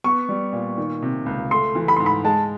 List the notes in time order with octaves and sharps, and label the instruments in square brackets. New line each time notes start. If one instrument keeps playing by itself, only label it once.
[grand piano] B3 [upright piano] C#6
[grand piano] G3
A#2
D#3
C3
C#2
[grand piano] A3 [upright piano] C6
[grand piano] E3
[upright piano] B5
[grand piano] G#2 [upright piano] C6
[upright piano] B5
[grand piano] G#3 [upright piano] A5